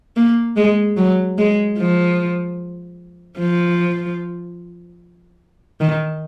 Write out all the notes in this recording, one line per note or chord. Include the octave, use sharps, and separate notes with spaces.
A#3
G#3
F#3
G#3
F3
F3
D#3